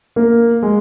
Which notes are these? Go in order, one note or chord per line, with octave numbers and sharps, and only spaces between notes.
A#3
G#3